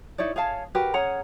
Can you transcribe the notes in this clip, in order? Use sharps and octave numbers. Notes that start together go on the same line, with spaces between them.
D#4 E4 C#5 D5
G#4 C#5 F5 A5
F#4 G4 A#4 B4
C#4 G#4 F#5 A#5